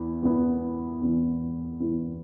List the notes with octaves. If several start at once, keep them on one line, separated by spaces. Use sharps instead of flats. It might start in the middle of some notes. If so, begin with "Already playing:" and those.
Already playing: E2 B3 E4
E2 E3 B3 E4
E2 E3 B3 E4
E2 E3 B3 E4